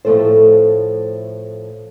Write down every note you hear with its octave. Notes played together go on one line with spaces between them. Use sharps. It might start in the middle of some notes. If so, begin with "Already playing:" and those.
A2 F3 F#3 A3 A4 C5